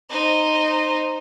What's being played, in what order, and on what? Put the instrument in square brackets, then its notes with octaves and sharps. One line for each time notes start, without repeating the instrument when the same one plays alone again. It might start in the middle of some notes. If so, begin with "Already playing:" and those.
[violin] D#4 C5